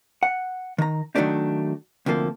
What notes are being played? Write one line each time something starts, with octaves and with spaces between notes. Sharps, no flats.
F#5
D#3 A#5
D#3 F#3 G#3 A3 D4 D#4
D2 C3 F3 A#3 A4